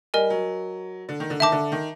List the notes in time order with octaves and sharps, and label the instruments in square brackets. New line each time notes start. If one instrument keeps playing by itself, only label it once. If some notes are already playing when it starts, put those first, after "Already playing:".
[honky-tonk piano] G3 [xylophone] A#4 D#5 G#5
[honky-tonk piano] F#3
D3
D#3
D3
[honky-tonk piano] D#3 [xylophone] E5 A5 D6
[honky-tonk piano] D3
D#3